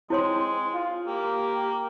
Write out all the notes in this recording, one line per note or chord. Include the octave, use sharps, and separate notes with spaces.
G#3 C4 E4 C#5 C6
F4
A#3 G4